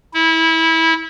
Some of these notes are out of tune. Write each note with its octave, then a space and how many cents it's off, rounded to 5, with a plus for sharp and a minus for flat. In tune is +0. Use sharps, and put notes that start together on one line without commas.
E4 -20